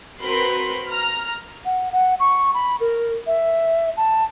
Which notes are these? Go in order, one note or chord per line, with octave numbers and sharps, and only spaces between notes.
C4 F#4 A#4 B4 B5 C6
A#5 F6
F#5
F#5
C#6
B5
A#4
E5
A5